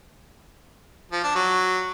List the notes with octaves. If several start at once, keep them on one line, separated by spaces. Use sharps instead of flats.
F3
D4
F#3